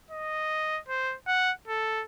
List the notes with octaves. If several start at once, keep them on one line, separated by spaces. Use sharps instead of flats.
D#5
C5
F#5
A4